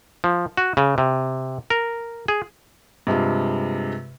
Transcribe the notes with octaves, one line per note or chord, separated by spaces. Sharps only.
F3
F#4
C#3
C3
A#4
G#4
G2 C3 G#3 F4